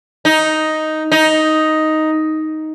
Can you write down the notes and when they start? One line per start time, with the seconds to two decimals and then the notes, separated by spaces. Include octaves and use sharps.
0.25 D#4
1.12 D#4